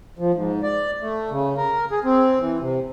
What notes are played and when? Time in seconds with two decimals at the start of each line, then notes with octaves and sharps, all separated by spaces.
0.19 F3
0.34 G#2
0.63 D5
1.01 A3
1.31 C#3
1.57 A#4
1.91 G#4
2.04 C4
2.40 E3
2.59 C3